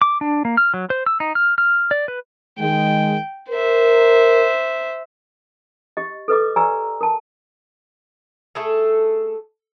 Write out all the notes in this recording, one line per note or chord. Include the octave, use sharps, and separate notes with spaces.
D6
D4
A#3
F6
F#3
C5
E6
D#4
F6
F6
D5
B4
D#3 G#3 G5
A#4 C5 E5
G4 D#5
A4 B4 D#5 D6
G4 B4 D5 G#5 A#5 E6
A#4 A5
A3 G#4 A4